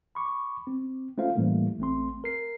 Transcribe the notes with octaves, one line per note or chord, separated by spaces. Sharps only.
B5 C#6 D6
C4
A3 C#4 F4 C5 F5
A2 E3 G3 A3 A#3
A1 A3 C4 C6
A#4 C7